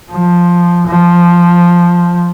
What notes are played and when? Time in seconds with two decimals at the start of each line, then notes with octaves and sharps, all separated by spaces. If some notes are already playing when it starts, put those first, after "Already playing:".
0.11 F3
0.86 F3